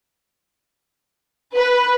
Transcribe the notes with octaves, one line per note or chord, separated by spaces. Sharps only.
B4